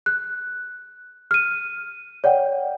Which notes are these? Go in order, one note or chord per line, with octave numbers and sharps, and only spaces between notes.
F#6
F6 D#7
C#5 D5 F#5 G5